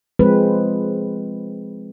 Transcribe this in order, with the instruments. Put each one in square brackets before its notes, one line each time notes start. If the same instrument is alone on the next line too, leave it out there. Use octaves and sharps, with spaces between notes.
[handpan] F3 G#3 C4 B4